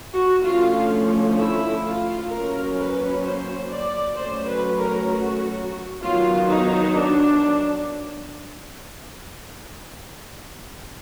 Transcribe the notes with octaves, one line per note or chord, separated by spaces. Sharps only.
F#4
D3 F3 A3 C#4 F4
E4
F4
F#3 A#3 C#4 A#4
B4
C5
D5
F#3 A3 C#4 C5
B4
A#4
F#4
D#3 F#3 B3 F4
D#4
D4